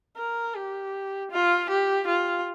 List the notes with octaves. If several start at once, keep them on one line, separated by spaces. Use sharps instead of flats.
A#4
G4
F4
G4
F4